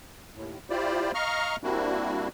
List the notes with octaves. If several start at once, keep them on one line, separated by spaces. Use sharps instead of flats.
D#2 A2
E4 F4 G4 C5 D5
D#5 F5 A#5 C#6 F6
G3 A#3 C4 D4 E4 F#4